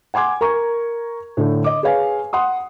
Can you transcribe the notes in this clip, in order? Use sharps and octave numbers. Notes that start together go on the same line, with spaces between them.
F#5 G#5 C6 D6 G#6
A#4 A#5 C#6
A2 D3 A3
D#5 D6
G#4 B4 C#5 F5 G#5
F#5 C6 D#6